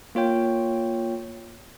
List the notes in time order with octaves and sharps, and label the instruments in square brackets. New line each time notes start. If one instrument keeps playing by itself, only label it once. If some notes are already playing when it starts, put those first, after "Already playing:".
[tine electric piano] A#3 F4 C#5 G5